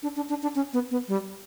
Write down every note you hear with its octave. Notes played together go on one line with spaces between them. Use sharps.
D4
D4
D4
D4
C#4
B3
B3
G3